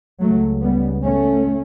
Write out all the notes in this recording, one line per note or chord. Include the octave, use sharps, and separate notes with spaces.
C#2 C#3 F#3 A3
G3 B3
A3 C#4